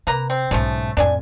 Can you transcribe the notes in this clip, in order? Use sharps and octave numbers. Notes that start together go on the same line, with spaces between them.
C3 A#3 B4 A#5
C4
B1 G#2 C#3 F3 A3
F2 A2 D4 D5 G#5